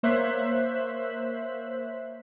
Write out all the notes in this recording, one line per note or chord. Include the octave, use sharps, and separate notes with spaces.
A#3 C5 C#5 E5 F#6 B6